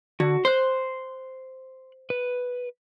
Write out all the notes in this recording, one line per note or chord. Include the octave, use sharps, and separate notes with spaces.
D3 F#4
C5 C6 F#6
B4